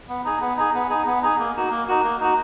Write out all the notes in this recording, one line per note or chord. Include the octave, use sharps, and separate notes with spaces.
B3
D#4 G#4
B3
D#4 G#4
B3
D#4 G#4
B3
D#4 G#4
A#3
D#4 F#4
A#3
D#4 F#4
A#3
D#4 F#4